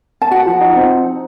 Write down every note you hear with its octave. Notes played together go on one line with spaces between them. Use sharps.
A5
F#4 F#5
F3
D#4
C4